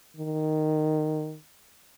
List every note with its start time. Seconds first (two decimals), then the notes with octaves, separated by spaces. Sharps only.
0.17 D#3